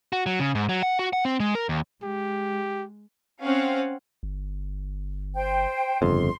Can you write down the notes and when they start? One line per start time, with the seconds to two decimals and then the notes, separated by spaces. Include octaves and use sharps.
0.13 F#4
0.26 F#3
0.40 C#3
0.55 G#2
0.69 F#3
0.83 F#5
0.99 F#4
1.13 F#5
1.25 C4
1.40 G#3
1.55 A#4
1.69 D#2
2.03 G#3 G4
3.41 C4 C#4 F5 F#5
4.23 G1
5.34 C5 G5
6.02 G1 F2 C#3 C6